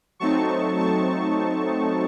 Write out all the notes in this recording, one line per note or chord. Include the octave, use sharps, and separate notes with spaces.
F#3 A3 C4 D#4 A5 C#6
A5 C#6